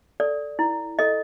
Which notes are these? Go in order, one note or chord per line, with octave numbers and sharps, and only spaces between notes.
A4 D5
E4
A4 D#5